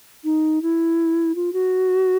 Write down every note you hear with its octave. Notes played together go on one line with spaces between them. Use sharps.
D#4
E4
F4
F#4